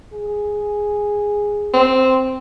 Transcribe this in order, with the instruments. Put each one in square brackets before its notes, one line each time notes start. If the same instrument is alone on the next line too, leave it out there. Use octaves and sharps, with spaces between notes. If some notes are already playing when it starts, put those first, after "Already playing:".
[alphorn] G#4
[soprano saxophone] C4